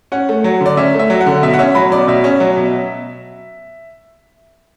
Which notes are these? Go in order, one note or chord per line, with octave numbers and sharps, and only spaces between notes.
C#4 F#5
A3
F#3
D3 D5
C#4 E5
A3
E5
F#3
F#5
D3
B2 E5
F#5
C#4 E5
F#3 B5
B2 D5
B2 E5
C#4
F#3
B2